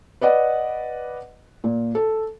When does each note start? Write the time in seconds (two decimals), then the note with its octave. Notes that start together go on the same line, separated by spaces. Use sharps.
0.21 B4 D5 D#5 F#5
1.64 A#2
1.95 A4